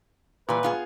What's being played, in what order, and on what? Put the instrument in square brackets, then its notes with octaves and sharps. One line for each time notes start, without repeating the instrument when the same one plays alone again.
[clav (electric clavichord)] A#2 [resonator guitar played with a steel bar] E3 G3 [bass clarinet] B4
[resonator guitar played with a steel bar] B3 F4 G#4